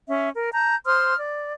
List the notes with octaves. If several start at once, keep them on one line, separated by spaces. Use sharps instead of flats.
C#4 E5
A#4
A5 A#5 G6
C5 C6 D#6 F6
D5